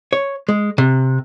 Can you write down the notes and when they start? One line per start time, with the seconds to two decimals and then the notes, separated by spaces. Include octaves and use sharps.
0.13 C#5
0.49 G#3
0.78 C3